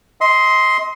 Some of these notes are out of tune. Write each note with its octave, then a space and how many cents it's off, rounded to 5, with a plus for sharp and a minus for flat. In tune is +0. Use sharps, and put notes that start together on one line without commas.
D#5 +35 C6 +0